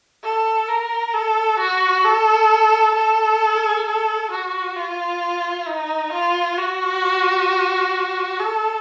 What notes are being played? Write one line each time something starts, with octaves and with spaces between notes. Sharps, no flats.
A4
A#4
A4
F#4
A4
A4
A4
F#4
F4
D#4
F4
F#4
A4